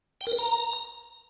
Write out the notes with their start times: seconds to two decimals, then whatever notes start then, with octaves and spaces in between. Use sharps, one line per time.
0.21 G5
0.27 A#4
0.33 B4
0.38 A#5